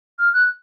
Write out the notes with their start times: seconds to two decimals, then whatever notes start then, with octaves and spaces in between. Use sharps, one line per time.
0.19 F6
0.33 F#6